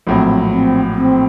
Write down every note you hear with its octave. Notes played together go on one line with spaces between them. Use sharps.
A#1 A2 F#3 C4
C4
C4